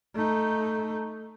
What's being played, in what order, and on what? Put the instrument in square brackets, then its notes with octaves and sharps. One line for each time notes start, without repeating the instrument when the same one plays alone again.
[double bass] A3 D#4